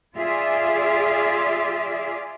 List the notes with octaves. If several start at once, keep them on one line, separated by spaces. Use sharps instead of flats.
F4 G#4 D5 E5